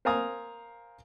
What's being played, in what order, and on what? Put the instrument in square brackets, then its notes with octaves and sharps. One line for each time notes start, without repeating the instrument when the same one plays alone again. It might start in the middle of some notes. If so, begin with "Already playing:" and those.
[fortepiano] A#4 C5 F5 G#5 A#5 D#6